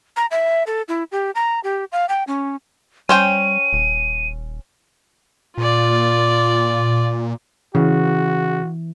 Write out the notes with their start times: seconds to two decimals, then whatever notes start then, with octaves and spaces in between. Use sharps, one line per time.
0.16 A#5
0.31 E5
0.67 A4
0.88 E4
1.12 G4
1.35 A#5
1.64 G4
1.92 F5
2.09 G5
2.27 C#4
3.09 G3 C#4 C5 G5 D#7
3.73 D#1
5.58 A#2 F4 D5
7.75 C#3 E3 F#4